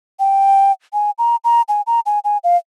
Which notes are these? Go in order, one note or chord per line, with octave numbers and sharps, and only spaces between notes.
G5
G#5
A#5
A#5
G#5
A#5
G#5
G#5
F5